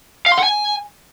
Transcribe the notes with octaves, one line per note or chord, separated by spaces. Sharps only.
F5
C6
F#5
G#5